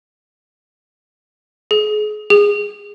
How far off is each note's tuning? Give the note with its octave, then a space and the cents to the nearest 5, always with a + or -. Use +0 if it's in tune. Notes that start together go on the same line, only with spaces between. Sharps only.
G#4 +35
G#4 -15